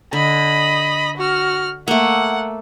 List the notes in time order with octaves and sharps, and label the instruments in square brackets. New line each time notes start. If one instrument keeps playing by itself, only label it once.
[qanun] D3 [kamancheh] D#5 B5
[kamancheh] F#4 F6
[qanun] A3 A#3 [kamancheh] F#5